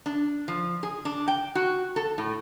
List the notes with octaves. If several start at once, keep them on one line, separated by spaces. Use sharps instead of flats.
D4
F3
G#4
D4
G5
F#4
A4
A2